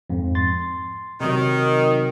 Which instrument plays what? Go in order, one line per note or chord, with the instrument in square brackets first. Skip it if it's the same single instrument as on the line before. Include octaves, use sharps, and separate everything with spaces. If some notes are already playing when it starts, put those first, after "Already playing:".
[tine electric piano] F2 G#2
C6 A6
[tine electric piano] C3 F#3 [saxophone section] D#3